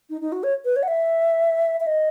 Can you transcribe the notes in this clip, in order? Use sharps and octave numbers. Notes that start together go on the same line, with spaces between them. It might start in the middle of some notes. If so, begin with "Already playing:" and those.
D#4
D#4
F#4
C#5
B4
C#5
F#5
E5
E5
D#5